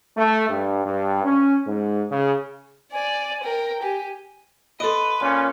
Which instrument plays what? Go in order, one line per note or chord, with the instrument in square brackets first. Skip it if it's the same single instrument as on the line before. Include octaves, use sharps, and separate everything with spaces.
[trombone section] A3
G2
G2
C#4
G#2
C#3
[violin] D5 [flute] G#5
[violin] A#4 G5
[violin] G4 [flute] G#5
[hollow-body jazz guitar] A4 D#5 [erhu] B4 [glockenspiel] C6 D#6 D7
[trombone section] A#2 C#4 [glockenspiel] C6